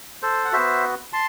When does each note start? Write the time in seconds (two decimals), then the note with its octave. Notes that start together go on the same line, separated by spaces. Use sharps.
0.22 A4 C5
0.45 F#5
0.52 B3 F#4 C5 E5
1.13 A5 C6